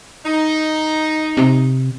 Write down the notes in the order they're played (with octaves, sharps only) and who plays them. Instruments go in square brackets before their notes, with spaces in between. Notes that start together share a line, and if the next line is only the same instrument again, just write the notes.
[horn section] D#4
[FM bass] C3